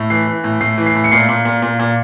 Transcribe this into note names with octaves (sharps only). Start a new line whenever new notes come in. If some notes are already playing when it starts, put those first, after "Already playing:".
Already playing: A2
E3 C7
E3
A2
A2 C7
E3
C7
A2
C#7
A#2 C7
A#2
A#2
A#2
A#2